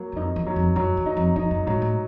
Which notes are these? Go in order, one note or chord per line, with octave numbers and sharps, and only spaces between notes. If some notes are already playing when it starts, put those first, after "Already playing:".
Already playing: F#3 A#3
F#2
F2 D#4
E2
F#3
F2
F#2 F#3
E2
D#4
F2
F2 D#4
F#2
G#2 F#3
A2